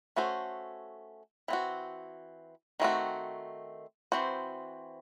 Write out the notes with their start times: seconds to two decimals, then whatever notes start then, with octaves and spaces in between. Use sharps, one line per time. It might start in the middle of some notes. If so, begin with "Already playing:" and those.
0.16 A3 C#4 F#4 A4 C5
1.48 E3 C4 F#4
2.80 D#3 A3 C4 F#4
4.12 E3 C4 F#4 C5